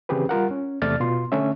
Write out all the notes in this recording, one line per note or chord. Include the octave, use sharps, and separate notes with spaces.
C#3 E3 C4 G4 G#4 B4
G3 F4 A#4 F#5
C#4
E2 C3 A3 D5 F6 A6
B2 F4 C6
D3 A3 C#4 E5